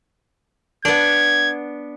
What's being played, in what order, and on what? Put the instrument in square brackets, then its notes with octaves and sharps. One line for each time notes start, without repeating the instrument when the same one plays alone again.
[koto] B3 D4 [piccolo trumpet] G#6